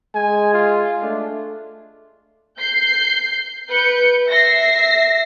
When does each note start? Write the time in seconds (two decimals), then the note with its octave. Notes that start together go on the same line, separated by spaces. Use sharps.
0.15 G#3 G#5
0.54 F4
1.02 A3 D4
2.59 G6 C7
3.70 B4 G6 C#7
4.29 E5 A#6 C7